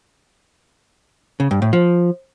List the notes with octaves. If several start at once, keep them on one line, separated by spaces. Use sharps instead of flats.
C#3
G2
A2
F3